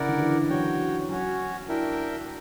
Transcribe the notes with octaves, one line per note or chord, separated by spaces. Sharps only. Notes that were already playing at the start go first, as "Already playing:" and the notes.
Already playing: C#3 E4 A#4 D5 F#5
D3
E3
F#3 F#4 C#5 G5
F#3 C#4 F#4 C#5
D4 E4 A#4 E5 G5